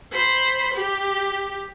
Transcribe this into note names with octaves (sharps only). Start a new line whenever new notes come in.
C5 B5
G4